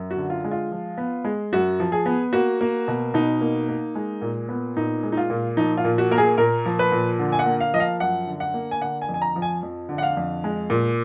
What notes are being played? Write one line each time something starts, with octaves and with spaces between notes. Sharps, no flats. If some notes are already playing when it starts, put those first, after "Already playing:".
Already playing: F#2
F#4
D3
F4
G#3
F4
F3
B3
G#3
F#2 F#4
F3
G#4
B3
A#3 F#4
A#3
B2
B2 D#4
A#3
A#3
G#3
A#2
B3
A#2 D#4
G#3
D#4
F4
A#2
F3 D#4
F4
A#2
F#4
A#3 A#4
G#4
A#2 A#4
F3
B4
A#2
D3
G#5
F#5
A#3
F5
F3 D#5
F5
F#2 F#5
D3
F#5
A#3
G#5
D3 F#5
G#5
F2
G#5
A#5
F3
G#5
F2
D3
F#5
F5
F2
G#3
A#2